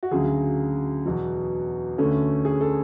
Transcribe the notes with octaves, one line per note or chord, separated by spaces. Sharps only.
F#4
D2 C#3 F#3 G#4
E2 B2 F#3
D2 D3 A3 C#4 A4
G#4
A4